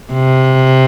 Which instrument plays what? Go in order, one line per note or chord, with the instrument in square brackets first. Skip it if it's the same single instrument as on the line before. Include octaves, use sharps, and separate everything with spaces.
[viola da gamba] C3